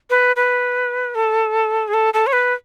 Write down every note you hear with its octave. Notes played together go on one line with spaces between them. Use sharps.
B4
B4
A4
G#4
A4
A4
C#5
B4